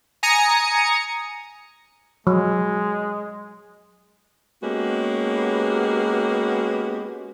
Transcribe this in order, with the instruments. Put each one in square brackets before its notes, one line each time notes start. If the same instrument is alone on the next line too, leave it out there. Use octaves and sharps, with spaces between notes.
[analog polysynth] G#5 A#5 D#6 A#6 C#7
[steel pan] F#3 [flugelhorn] G#3
[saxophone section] G#3 A#3 B3 C#4 F#4 G4